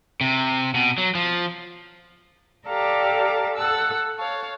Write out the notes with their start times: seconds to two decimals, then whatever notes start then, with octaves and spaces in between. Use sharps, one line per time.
0.21 C3
0.75 B2
0.98 F#3
1.15 F3
2.67 G4 A4 D5 F5 A5 A#5
3.55 A4 F#5 A5 E6
4.18 C#5 F5 A5